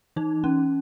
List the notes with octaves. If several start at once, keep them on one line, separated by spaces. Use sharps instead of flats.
E3 D#4
C#4